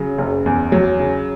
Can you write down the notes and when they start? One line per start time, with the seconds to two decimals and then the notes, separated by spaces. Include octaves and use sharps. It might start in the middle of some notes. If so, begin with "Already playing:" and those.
Already playing: C#3 F#3
0.18 F#1
0.46 E2
0.72 F#3
1.00 C#3